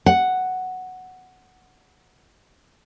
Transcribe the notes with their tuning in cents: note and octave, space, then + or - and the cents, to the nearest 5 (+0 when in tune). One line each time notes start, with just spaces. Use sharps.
F#5 +0